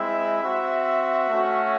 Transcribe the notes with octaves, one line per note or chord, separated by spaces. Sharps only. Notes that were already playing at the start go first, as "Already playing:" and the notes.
Already playing: G#3 C4 E4 E5
C4 F#4
A3 C#4 F#4